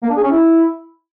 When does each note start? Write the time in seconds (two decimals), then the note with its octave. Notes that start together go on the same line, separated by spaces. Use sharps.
0.03 A#3
0.09 D4
0.16 G#4
0.23 C#4
0.30 E4